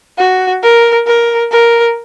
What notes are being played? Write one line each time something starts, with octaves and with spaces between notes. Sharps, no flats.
F#4
A#4
A#4
A#4